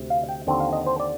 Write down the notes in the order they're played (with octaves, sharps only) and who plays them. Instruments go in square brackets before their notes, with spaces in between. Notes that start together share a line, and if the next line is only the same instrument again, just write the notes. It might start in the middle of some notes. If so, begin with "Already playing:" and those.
Already playing: [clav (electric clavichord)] D2 C3
F5
G5
D#2 D3 F3 C4
F5
D#5
C5
D5